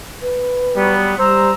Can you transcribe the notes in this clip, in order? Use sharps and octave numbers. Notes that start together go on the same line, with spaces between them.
B4
F#3 G3 B3
G3 C5 A#5 E6